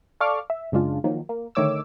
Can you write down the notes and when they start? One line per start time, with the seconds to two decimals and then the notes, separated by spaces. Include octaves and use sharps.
0.20 A4 D5 F5 C#6 D6 F6
0.50 E5
0.72 F#2 C#3 G#3 D4 F4
1.04 D#3 F3 F#3 A#3
1.29 A#3
1.55 D3 D#3 A3 C#5 D6 E6